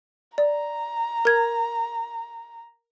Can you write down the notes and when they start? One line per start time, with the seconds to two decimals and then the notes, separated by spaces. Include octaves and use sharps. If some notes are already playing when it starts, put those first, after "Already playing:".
0.38 D5 A#5
1.25 A#4 G#6